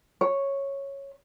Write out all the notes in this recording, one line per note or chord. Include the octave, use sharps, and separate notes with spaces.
C#5